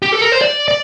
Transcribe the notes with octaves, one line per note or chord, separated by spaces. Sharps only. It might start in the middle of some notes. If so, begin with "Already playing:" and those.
G4
A4
A#4
C5
D5
D5